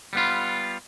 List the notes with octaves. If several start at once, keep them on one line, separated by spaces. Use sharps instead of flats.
G3 B3 F4